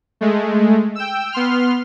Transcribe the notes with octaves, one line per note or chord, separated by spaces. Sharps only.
G#3 A3
G5 E6
B3 C6 F6